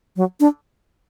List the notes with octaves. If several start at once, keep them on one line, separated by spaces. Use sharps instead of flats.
F#3
D4